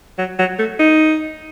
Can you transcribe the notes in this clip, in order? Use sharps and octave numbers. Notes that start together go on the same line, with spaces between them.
F#3
F#3
A3
D#4